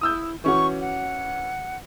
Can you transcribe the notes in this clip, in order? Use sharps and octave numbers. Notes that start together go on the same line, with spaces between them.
E4 D#6 E6 G6
E3 C#4 F#4 C#6
F#5